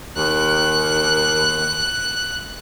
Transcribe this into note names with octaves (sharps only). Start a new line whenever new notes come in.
D#2 F#6